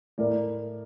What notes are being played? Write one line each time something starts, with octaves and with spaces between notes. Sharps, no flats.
A2 A#4 D5